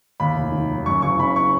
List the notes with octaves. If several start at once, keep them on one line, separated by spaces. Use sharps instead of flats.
D#2 B5
F1
D#3
F#3
F#2 C#6
F#1 C#6
C#3 B5
C#6